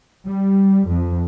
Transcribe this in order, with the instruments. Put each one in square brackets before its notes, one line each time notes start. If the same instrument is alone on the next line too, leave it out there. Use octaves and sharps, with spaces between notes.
[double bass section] G3
F2